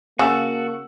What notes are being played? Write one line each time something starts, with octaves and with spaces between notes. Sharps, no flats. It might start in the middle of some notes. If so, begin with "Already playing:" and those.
C#3 A#3 F#4 F#5 A5 E6